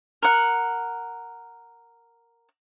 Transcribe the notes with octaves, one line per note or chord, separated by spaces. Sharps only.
A#4 F#5